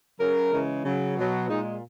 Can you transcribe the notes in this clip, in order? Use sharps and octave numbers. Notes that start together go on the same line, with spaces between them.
C#3 F#3 A#4
C#3 E3 G#3
C#3 F#3
B2 F#3
A#2 G#3 D#4